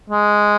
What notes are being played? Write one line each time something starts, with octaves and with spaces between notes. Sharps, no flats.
G#3